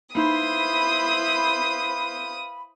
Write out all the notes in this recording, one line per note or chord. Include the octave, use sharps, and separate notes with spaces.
A#3 D#4 E4 B4 C5 F5 B5 D#6